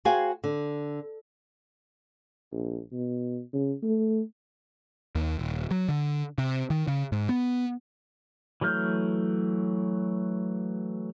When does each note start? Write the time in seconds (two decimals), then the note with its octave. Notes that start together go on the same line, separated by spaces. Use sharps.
0.05 F#4 G#4 C5 F5 G5 G#5
0.44 D3
2.52 A#1
2.92 B2
3.53 C#3
3.83 A3
5.15 D#2
5.39 D#1
5.71 F#3
5.89 D3
6.38 C3
6.70 D#3
6.88 C#3
7.12 G#2
7.29 B3
8.61 E3 F#3 A3 F6 G6